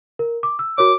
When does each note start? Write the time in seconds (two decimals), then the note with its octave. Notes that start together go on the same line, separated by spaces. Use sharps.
0.19 A#4
0.43 D6
0.59 E6
0.78 F#4 A#4 C#5 D6